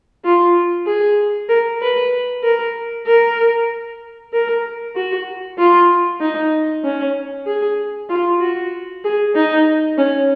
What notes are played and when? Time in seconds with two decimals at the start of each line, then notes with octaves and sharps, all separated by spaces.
0.25 F4
0.86 G#4
1.49 A#4
1.82 B4
2.43 A#4
3.07 A#4
4.33 A#4
4.96 F#4
5.58 F4
6.20 D#4
6.84 C#4
7.46 G#4
8.09 F4
8.41 F#4
9.04 G#4
9.36 D#4
9.98 C#4